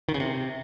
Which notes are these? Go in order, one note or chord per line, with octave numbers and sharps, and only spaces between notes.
D#3
C#3
C3